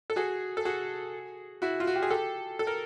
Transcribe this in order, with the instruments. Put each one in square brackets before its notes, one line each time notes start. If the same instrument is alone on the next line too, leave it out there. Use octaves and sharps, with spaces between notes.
[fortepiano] A4
F#4 G#4
A4
F#4 G#4
E4 F#4
F4
F#4
G4
G#4
G4 A4
A4
A#4